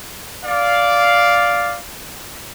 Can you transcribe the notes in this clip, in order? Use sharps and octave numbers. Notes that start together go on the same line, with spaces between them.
D5 F5